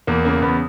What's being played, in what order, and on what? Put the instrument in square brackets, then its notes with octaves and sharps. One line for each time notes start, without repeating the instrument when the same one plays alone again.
[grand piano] E2 A#3
C#3 A#3
E2 B3